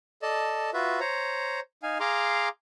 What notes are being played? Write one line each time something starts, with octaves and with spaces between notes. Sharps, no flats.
A4 D5 D#5 A5
F4 F#4 B4 E5
C5 C#5 A#5
D#4 F5 G#5
G#4 F5 A#5 C6 D6